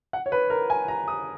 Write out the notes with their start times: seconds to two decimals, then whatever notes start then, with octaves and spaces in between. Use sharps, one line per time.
0.13 F#5
0.26 C#5
0.32 B4
0.50 A#4
0.70 G#5
0.88 A#5
1.08 D#6